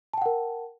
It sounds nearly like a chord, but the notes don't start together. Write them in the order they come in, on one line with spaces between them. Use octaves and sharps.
A5 G5 F#5 A#4